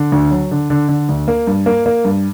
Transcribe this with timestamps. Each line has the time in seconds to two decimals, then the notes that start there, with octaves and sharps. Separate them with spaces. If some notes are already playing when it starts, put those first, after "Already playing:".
Already playing: D3
0.12 D2
0.31 F#3
0.51 D3
0.70 D3
0.89 D3
1.09 D2
1.28 A#3
1.47 G2
1.66 A#3
1.86 A#3
2.05 G2